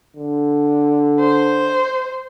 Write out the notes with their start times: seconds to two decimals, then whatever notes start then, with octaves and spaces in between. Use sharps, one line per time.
0.16 D3
1.20 C5